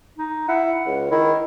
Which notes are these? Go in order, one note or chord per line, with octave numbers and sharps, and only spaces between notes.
D#4
E4 F#5
C#2
D#3 E4